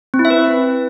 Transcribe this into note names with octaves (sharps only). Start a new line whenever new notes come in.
C4
E4
E5
B4